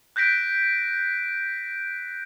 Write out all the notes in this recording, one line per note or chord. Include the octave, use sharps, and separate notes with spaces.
F#6 G6 A#6 B6 D7